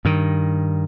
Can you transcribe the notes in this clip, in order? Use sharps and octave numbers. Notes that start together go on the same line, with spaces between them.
G2 D#3